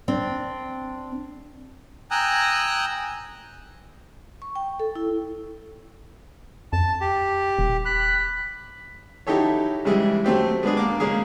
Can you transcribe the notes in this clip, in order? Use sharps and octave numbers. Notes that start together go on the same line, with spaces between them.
C4 D4
G5 G#5 A#5 D#6 E6 F#6
C#6
G5
A4
E4
F2 A5
G4
D#1
B5 F#6
D#4 E4 F#4 G4 A4 C#5
C#3 E3 G3 G#3 E4
F#3 A3 C4 G4
G#3 B3 D4 G#4
A#3 D6
C#3 G#3 A#3 G#4